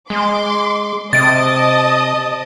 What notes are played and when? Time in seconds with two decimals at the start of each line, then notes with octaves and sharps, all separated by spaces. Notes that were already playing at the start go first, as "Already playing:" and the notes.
0.10 G#3 C6 D6
1.13 C3 D#5 A5 D#6 A6 D7